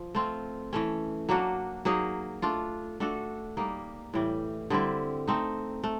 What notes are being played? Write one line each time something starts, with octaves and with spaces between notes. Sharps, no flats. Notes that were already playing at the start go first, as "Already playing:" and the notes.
Already playing: F3
A3 C4 F4
E3 A3 C#4
F#3 A#3 D4 F#4
F#3 A#3 D#4 G#4
A3 D4 F4
A3 D4 F#4 A4
G3 A#3 D#4
A2 E3 G3
D3 G3 C4 E4
A3 C4 D#4
A3